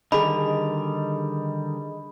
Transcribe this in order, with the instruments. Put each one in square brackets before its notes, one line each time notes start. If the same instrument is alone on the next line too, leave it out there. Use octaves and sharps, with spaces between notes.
[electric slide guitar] D3 D#3 G3 [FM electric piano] G#4 D#5 [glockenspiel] B5